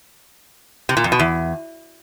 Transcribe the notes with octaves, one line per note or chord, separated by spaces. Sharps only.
C3
A#2
F2
B2
E2